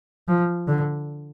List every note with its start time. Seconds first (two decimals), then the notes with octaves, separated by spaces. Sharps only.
0.28 F3
0.68 D3